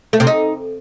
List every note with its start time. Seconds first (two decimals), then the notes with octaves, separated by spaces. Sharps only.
0.13 A3
0.20 C3
0.27 D#4